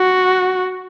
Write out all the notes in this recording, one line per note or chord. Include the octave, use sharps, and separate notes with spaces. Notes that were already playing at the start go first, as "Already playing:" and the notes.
Already playing: F#4